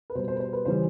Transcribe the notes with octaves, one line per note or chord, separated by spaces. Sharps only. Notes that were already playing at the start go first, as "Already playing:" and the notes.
B4
B2 G3 C5
C5
B4
C5
B4
C#3 E3 G3 C5